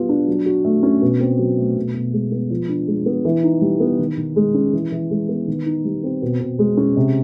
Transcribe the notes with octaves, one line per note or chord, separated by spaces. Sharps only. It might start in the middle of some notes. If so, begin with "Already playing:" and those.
Already playing: F#3 G3 B3 F4
D4
F#3
F#4
A3
C#4
B2
C4
F#3
A3
B2
B2
G#3
B3
F3
D4
G#3
B3
E3
D#4
G3
B3
D#3
D#3
G#3
C#4
E3
E3
G#3
B3
D#3
D#4
G3
C4
B2
B2
G#3
C#4
C3